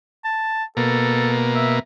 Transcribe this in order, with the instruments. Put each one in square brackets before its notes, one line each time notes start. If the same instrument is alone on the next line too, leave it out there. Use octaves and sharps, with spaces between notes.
[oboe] A5
[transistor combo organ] B2 A#3 [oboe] A4
[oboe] E5